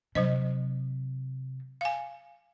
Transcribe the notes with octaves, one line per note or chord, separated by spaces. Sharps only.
C3 F#3 C5 D#5
F5 G#5